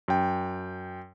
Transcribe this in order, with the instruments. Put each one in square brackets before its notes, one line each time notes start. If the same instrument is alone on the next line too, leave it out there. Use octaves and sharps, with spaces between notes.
[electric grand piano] F#2 G5